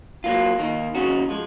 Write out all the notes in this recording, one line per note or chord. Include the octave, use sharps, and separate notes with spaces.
F#3 A#3 F4
D#2 D#3 A#3
D#2 C#3 F#3 C#4 F#4
F3 G#3